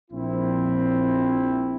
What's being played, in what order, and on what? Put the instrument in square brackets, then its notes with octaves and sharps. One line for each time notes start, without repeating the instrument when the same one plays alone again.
[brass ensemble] A#1 C4 E4